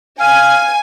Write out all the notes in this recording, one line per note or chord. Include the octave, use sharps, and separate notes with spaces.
F5 G#5